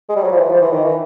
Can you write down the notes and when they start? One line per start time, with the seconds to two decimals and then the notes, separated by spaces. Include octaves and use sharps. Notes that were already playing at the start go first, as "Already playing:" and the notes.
0.09 G#3
0.16 G3
0.24 F#3
0.31 F3
0.38 E3
0.49 F3
0.61 E3
0.73 D#3
0.84 E3